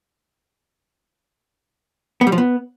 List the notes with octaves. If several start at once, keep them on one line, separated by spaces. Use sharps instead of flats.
B3
G3
F3
B3